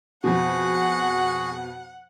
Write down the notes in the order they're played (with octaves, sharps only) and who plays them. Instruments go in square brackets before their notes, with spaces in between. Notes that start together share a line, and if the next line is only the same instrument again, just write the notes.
[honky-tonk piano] F2 B2 [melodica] F#4 G#4 [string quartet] F#5